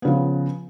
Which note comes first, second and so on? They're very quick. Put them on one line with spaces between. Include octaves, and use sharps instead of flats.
B3 C#3 F3